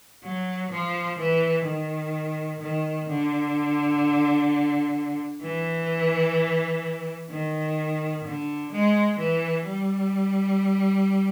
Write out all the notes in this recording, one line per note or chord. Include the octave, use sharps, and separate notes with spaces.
F#3
F3
E3
D#3
D#3
D3
E3
D#3
D3
G#3
E3
G3